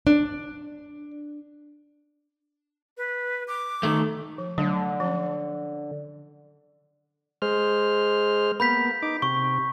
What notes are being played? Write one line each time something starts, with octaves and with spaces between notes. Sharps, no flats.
D4
B4
D6
D#3 A3
F3
D3 F#3 A3 D4
F3 C#4
G#3 C5 F6
A#3 B3 B5 G6 B6
D#4 D6
C3 C#6